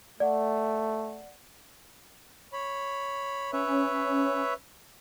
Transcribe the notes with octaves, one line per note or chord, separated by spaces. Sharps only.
A3 D5 F#5
C#5 B5
C#4 B4 C#5 E5